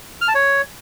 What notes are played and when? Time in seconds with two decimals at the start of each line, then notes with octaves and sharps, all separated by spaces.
0.21 F6
0.28 A5
0.35 C#5